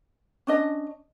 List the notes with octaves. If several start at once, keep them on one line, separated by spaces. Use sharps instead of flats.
C#4 D4 D#5